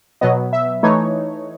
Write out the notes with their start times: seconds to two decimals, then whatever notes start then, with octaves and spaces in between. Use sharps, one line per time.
0.21 B2 F#3 B3 D#5
0.53 E5
0.83 E3 A3 D#4 C#5